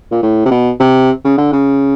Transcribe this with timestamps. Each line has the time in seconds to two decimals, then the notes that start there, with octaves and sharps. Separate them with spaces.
0.12 A#2
0.23 A2
0.45 C3
0.51 B2
0.80 C3
1.24 C#3
1.38 D3
1.53 C#3